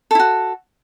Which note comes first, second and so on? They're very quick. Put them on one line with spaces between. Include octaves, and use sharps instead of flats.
A4 E4 F#4